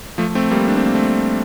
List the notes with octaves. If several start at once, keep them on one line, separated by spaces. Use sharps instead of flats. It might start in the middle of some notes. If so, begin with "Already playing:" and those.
F3 A3
A3 C4
G3 A#3
D4
C4
A#3
A3 C4